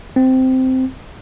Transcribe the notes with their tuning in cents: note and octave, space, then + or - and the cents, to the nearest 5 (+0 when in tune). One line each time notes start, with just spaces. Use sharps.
C4 -10